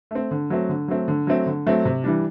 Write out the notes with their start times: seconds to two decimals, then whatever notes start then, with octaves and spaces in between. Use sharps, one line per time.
0.11 A3 C4
0.31 D3
0.50 F#3 A3 C4
0.69 D3
0.88 F#3 A3 C4
1.08 D3
1.27 F#3 A3 C4
1.46 D3
1.66 F#3 A3 C4
1.85 C3
2.04 E3 G3 D4